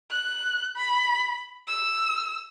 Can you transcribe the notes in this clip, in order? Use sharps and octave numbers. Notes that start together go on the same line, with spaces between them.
F#6
B5
E6